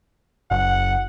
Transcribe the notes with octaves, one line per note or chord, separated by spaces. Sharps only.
F#1 F#5